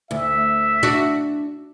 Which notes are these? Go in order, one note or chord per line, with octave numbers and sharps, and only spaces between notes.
D2 E5
D4 F#4